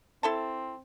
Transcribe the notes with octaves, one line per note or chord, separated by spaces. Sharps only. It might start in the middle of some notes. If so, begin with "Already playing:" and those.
C4 E4 A4 A5